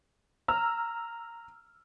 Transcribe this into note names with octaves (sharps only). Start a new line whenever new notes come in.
A#5 E6 F6